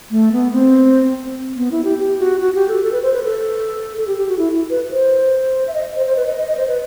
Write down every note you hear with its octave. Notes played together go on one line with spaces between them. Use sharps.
A3
B3
C4
B3
E4
G4
G4
F#4
F#4
G4
A4
A4
B4
C5
B4
A4
A4
G4
G4
F#4
E4
B4
C5
E5
D#5
C5
C5
B4
D#5
D#5
D#5
C5
B4